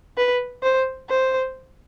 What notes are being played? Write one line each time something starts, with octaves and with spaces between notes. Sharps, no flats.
B4
C5
C5